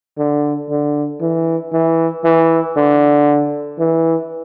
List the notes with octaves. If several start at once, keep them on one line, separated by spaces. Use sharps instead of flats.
D3
D3
E3
E3
E3
D3
E3